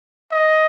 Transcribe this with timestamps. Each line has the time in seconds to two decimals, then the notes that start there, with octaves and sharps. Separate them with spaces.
0.31 D#5